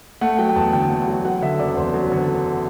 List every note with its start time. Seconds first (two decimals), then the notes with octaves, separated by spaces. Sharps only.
0.21 A3 F#5
0.39 F#3 G5
0.49 G5
0.56 E2 A5
0.73 D3 G5
0.90 A3
1.08 F#3
1.25 F#3 F#5
1.42 D3 E5
1.59 F#1 D5
1.77 E2 C5
1.94 F#3
2.12 D3